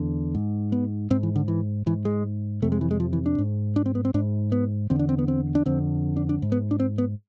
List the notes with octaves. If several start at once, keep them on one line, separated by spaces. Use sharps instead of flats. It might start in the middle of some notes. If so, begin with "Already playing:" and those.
Already playing: E2 D3
G#2
B3
G#2 C4
E3
D3
E3
G#2 E3
G#3
F2 C3 A3
G#3
E3
G#3
F3
E3
D4
G#2
D4
C4
B3
C4
G#2 D4
B3
E2 D3 C4
D4
C4
B3
C4
D4
F2 D3 C4
D4
D4
G#2
B3
D4
C4
B3